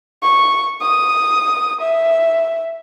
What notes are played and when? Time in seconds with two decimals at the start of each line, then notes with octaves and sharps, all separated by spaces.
0.23 C#6
0.82 D#6
1.81 E5